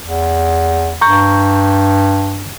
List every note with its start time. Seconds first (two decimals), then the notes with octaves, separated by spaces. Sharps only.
0.02 E2
1.01 G2 A#5 C#6 G6